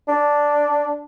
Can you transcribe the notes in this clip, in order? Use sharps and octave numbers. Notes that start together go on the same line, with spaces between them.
D4